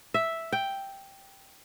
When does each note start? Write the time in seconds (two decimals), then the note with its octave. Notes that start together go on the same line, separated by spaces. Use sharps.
0.14 E5
0.52 G5